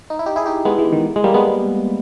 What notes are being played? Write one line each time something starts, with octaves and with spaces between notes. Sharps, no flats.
D#4
E4
D#4 G4
E4 G#4
D#4 G4
G#3 B3
E3 G#3
D#3
G#3
G3 A#3
G#3 B3